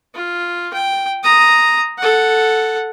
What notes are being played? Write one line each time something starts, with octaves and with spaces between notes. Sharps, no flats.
F4
G5
A#5 D#6
A4 F#5